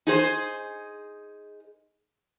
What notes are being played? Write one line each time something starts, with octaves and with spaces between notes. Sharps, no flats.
D#4 G#4 C5